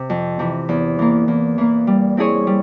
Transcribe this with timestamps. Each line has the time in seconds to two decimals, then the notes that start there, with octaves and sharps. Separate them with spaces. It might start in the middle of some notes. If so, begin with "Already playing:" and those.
Already playing: C3
0.10 F2
0.39 C3 E3
0.69 E2
0.99 E3 A#3
1.28 E2
1.58 E3 A#3
1.87 G3
2.17 C4 E4 G#4 C#5
2.47 G3